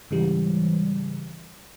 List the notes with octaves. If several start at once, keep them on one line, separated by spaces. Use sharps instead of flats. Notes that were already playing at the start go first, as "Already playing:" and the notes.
G#2 C#3 E3 G3